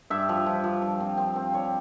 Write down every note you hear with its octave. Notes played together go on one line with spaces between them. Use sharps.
G2 E5
F3
F3
F3
G2
C4
C4
C4
G3 C#5